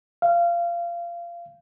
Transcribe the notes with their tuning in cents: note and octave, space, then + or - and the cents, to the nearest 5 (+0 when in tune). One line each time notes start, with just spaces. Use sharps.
F5 -25